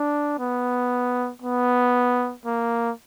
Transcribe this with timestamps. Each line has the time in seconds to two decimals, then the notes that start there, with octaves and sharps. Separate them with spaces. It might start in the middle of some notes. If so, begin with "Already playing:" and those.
Already playing: D4
0.39 B3
1.42 B3
2.45 A#3